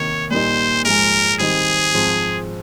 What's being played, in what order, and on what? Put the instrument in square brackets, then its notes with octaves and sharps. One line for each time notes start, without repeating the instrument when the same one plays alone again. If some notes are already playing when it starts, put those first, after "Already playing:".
Already playing: [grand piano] C3 D#3 A#3 D#4 [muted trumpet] C#5
[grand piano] A#2 G3 A#3 D#4 [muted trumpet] C5
[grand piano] G#2 F3 G#3 [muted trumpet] A#4
[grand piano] D#3 G3 C4 D#4 [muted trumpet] G#4
[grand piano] G#2 F3 G#3 C4